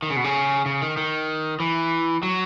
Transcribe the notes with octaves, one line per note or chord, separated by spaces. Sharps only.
D#3
C#3
B2
C#3
C#3
D#3
D#3
E3
F#3